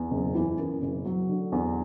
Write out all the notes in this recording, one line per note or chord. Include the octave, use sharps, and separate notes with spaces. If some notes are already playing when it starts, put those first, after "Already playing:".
Already playing: E2
F#1
E3
F#2
F#1
F#3
D3
E2